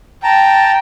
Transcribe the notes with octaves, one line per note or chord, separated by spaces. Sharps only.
G5 A5 A#5